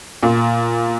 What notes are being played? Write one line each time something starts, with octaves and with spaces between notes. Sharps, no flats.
A#2